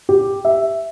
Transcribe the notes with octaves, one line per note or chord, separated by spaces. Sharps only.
G4
E5